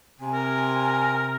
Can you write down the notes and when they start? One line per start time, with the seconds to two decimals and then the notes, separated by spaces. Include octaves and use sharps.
0.20 C3 G#5
0.33 A#4